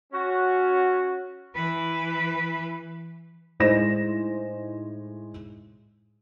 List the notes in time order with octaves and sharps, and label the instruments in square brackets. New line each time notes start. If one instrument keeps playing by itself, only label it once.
[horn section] C#4 F#4
[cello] E3 B4
[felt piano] A2 G#3 D#4 C5 A#6 E7